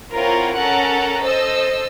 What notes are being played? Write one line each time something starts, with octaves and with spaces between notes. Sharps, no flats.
C4 E4 F4 A#4 C#5 F#5
C#4 A4 A#4 F#5 A5 A#5
A4 C5 D#5 E6